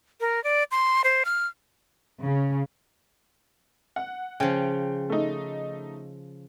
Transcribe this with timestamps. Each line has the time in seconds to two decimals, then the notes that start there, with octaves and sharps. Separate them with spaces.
0.21 A#4
0.44 D5
0.71 C6
1.04 C5
1.25 F6
2.23 C#3
3.96 F#5
4.40 C#3 F3 G5
5.10 A3 D#4